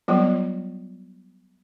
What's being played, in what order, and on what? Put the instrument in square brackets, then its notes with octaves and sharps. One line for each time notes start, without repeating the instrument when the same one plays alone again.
[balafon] F#3 G3 B3 F4